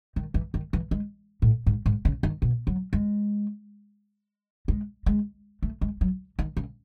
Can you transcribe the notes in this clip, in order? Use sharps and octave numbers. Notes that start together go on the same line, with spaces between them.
D#3
E3
D#3
E3
G#3
A2
G#2
G#2
C#3
D#3
B2
F#3
G#3
G#3
G#3
A3
G#3
F#3
D#3
C#3